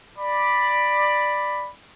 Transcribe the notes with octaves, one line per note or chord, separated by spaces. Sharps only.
D5 B5